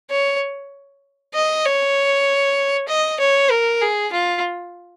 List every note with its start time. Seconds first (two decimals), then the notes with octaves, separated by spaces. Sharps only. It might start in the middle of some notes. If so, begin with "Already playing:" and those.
0.10 C#5
1.34 D#5
1.65 C#5
2.88 D#5
3.20 C#5
3.50 A#4
3.81 G#4
4.12 F4